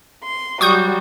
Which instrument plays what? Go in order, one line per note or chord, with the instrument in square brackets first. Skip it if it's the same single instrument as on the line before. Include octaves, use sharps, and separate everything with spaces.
[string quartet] C6
[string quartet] F#3 G3 F#4 [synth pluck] C#6 D#6 G6